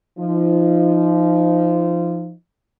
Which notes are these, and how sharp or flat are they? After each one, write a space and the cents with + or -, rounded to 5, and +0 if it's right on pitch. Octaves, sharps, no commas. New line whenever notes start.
F3 -20 D#4 +0